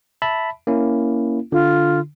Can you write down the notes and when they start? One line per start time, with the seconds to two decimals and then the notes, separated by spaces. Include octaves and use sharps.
0.22 E5 A5 B5
0.67 A#3 C#4 E4
1.52 D3 F4